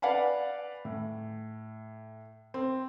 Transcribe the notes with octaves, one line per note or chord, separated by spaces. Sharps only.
B4 D5 F5 F#5 G#5 B5
A2
C4